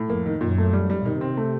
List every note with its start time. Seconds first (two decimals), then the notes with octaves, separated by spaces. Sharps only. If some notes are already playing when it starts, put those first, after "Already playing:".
Already playing: A2
0.09 F2 A#3
0.26 D#3
0.41 F#2 A#2
0.58 A3
0.73 G3
0.90 G3
1.05 C3 D#3
1.21 C4
1.37 A3